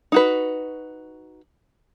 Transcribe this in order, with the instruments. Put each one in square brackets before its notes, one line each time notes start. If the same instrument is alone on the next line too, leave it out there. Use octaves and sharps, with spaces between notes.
[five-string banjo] D#4 F#4 B4